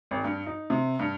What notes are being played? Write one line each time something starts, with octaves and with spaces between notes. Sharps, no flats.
G#1
G2
D#4
C3
G2